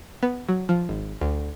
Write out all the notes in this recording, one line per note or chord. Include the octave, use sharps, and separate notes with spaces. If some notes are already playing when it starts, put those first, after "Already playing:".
B3
F#3
F3
G#1
D2